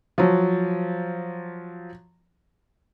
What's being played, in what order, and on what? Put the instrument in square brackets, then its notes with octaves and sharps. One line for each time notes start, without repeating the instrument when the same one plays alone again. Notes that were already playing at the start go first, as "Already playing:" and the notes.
[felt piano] F3 F#3